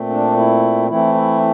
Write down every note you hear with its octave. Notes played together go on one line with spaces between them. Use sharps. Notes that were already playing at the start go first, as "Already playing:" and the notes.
Already playing: A#2 A3 C4
D4
E4
E3 A3 C4 E4
E4